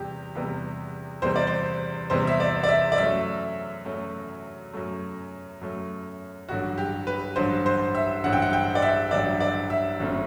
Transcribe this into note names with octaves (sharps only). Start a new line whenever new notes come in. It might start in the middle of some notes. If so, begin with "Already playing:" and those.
Already playing: E2 C3 G3 G4
E2 C3 G3 B3
E2 C3 G3 B3 C5
D5
C5
E2 C3 G3 B3 C5
E5
D5
D5
E5
D5
F#2 F#3 A3 E5
F#2 F#3 A3
F#2 F#3 A3
F#2 F#3 A3
A1 G2 D3 F#3 F#4
G4
B4
A1 G2 D3 F#3 C5
C5
E5
A1 G2 D3 F#3 F#5
G5
F#5
G5
D5
E5
A1 G2 D3 F#3 D5
D5
E5
G1 F#2 D3 A3 C4